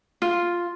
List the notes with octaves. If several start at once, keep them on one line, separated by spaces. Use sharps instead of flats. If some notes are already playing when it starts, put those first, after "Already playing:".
F4